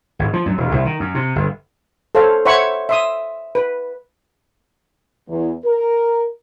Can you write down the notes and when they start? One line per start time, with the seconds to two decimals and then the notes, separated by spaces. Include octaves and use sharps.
0.19 G#1
0.33 F3
0.46 F#2
0.57 E1
0.72 C2
0.85 D#3
1.00 F#2
1.15 C3
1.36 G1
2.15 A4 C5 C#5 F5
2.46 C5 C#5 E5 F#5 B5 C#6
2.89 E5 C6 D#6
3.55 B4
5.28 E2
5.65 A#4